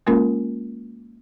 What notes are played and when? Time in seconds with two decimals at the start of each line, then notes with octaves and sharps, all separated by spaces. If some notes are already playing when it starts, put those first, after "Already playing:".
0.07 G#3 A#3 C#4 F4 A#4